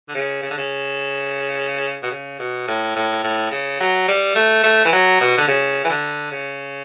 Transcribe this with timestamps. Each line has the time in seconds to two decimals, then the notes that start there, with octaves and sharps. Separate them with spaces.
0.09 D3
0.15 C#3
0.43 C#3
0.50 D3
0.57 C#3
2.03 B2
2.11 C#3
2.39 B2
2.68 A2
2.96 A2
3.24 A2
3.51 C#3
3.80 F#3
4.08 G3
4.35 A3
4.64 A3
4.85 E3
4.92 F#3
5.20 B2
5.38 D3
5.48 C#3
5.84 E3
5.90 D3
6.32 C#3